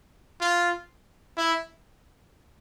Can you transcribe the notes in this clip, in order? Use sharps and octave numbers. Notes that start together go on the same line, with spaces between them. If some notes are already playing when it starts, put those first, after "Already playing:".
F4
E4